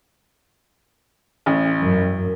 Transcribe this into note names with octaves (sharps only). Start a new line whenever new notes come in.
A1
F#2